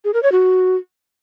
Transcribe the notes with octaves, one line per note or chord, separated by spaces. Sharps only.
G#4
A#4
C#5
F#4